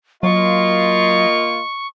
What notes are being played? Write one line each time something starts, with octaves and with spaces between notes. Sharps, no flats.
F#3 A#3 F4 D#5 C#6